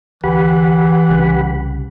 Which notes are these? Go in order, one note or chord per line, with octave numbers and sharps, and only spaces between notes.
D2 E3 G4 F#5 B5
C2 C#3